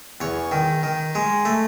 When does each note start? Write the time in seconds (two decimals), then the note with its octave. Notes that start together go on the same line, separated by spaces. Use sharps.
0.21 E2 C#5
0.52 D#3
0.83 D#3
1.15 G#3
1.45 A3